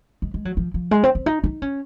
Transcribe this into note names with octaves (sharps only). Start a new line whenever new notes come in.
G#3
G#3
F#3
F3
F3
G#3
C4
C4
D#4
D#4
C#4